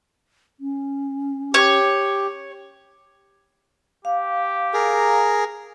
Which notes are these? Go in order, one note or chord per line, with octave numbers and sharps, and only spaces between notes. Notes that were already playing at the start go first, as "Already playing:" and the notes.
C#4
G4 C#5
G4 F5
G#4 A#4 A#5